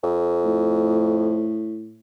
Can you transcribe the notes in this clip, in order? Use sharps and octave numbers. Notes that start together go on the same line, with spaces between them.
F2
A2